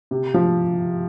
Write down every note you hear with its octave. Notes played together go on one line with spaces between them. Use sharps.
C3
F3